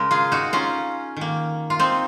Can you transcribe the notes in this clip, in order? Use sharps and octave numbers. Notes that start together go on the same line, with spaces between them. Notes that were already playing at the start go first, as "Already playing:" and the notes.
Already playing: C#3 G#3 A#4
F4 G#4
D#4 F#4
C#4 F4
D#3 A#3
F4
C4 D#4